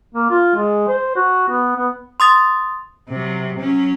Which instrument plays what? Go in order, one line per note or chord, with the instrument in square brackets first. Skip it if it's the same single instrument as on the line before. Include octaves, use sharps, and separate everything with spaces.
[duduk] A#3
F4
G#3
C5
F#4
B3
B3
[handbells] C6 D#6 A6
[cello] C3 F#3
F#3 C#4